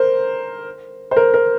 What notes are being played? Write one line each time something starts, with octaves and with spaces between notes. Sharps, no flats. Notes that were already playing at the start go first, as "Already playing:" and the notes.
Already playing: A#4 C5
C5
A#4
A#4